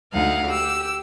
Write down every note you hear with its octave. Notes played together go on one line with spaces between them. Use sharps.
D2 D#4 F5 F#5
G4 E6